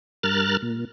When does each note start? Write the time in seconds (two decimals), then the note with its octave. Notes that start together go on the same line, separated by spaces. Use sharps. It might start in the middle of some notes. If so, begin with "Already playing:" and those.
0.23 G2 A#4 F6 F#6 A6
0.62 A#2